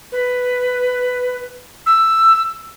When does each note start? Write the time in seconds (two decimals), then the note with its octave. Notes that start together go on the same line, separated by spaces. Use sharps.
0.12 B4
1.86 E6